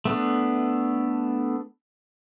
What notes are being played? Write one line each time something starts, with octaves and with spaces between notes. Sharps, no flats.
A3 B3 D4